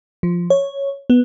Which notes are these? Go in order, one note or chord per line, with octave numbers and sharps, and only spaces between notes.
F3
C#5
B3